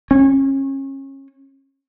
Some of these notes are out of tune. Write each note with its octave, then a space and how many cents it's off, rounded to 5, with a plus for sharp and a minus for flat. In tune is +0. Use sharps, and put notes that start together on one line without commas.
C#4 -30